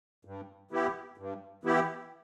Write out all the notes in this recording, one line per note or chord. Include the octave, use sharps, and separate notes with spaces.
G2
E3 B3 E4 G4
G2
E3 B3 E4 G4